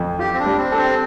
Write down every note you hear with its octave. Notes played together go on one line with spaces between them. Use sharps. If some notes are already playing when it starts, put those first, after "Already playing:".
Already playing: F2 A3
F4 G4
C4
D4
G3
C4
D4 A4
C4